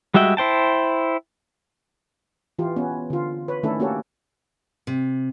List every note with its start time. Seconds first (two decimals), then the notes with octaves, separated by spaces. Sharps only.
0.14 G3 G#3 F#4 E5 G5
0.37 E4 C5 G5 A5
2.59 E3 F4 G4
2.76 B3 C#4
3.10 D3 F4
3.48 B4 C#5
3.63 D#3 A3 C#4 D4 E4 A4
3.80 A#3 C#4 F#4 G4 A4 C#5
4.87 C3